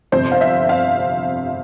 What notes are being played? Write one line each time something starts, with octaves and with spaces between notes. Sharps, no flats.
G1 F2 C3 C5
F5
E5
F5